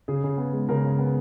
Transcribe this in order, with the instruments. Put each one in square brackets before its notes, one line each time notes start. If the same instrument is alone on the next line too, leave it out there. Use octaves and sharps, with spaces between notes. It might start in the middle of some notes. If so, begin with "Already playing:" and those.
[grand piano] C#3 G#4
C#3
B3
G#3
C#3 A#4
C#3
B3